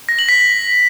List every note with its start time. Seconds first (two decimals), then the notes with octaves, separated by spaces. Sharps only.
0.09 A#6
0.19 F#7
0.29 B6